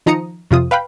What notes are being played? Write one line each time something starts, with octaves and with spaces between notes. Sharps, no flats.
D#3 F3 D#4 A#5 D#6 C#7
F2 C3 F4 D#6
B4 F5 G5 B5